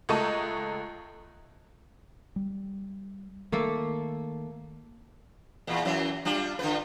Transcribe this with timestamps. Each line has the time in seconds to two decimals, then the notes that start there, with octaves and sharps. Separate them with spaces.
0.09 C#2 A3 D#5 A5 C#6 D#7
2.36 G3
3.52 D#3 A3 A#3 A4
5.67 E2 A#2
5.85 F#2 E3 F#3
6.25 G3 D4 F4
6.59 D3 F4 B4